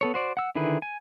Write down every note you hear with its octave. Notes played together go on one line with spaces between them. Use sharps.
B3 A4 C#5
F#4 C5 D5
F#5 E6
D3 D#3 E4 G#4 B4
G#5